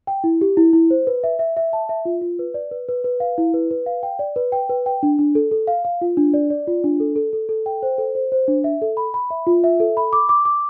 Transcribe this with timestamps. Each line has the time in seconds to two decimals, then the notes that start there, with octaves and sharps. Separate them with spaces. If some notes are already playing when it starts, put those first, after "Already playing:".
0.07 G5
0.24 E4
0.41 G4
0.57 E4
0.73 E4
0.90 C5
1.07 B4
1.24 E5
1.39 E5
1.57 E5
1.73 A5
1.89 E5
2.05 F4
2.22 F4
2.39 B4
2.54 D5
2.71 B4
2.88 B4
3.04 B4
3.20 F5
3.38 E4
3.54 B4
3.71 B4
3.86 F5
4.03 G5
4.19 D5
4.36 B4
4.52 G5
4.70 B4
4.86 G5
5.03 D4
5.19 D4
5.35 A4
5.51 A4
5.67 F5
5.85 F5
6.01 F4
6.17 D4
6.34 D5
6.50 D5
6.67 F4
6.84 D4
7.00 A4
7.16 A4
7.33 A4
7.49 A4
7.66 G5
7.83 C5
7.98 A4
8.15 C5
8.32 C5
8.48 D4
8.64 E5
8.82 A4
8.97 B5
9.14 B5
9.30 E5
9.47 F4
9.64 E5
9.80 A4
9.97 B5
10.13 D6
10.29 D6
10.45 D6